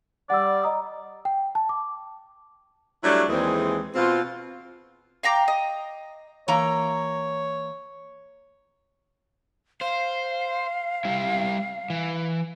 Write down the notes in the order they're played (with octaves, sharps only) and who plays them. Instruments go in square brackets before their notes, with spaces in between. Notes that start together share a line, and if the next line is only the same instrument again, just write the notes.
[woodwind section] G3 D5 [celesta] F#5 E6
[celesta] D#5 A#5 D#6
G5
A5
D6
[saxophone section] F#3 G3 A3 D4 E4
D#2 E3 G#3 C4 G#4
B2 C4 F4
[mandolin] F5 G5 A#5 D6
D#5
[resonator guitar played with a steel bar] E3 A#3 A#5 [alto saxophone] C#5
[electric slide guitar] C5 [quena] F5
[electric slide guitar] G3 E4
E3